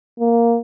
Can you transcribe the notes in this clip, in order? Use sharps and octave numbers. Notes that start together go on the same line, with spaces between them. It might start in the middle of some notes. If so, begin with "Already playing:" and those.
A#3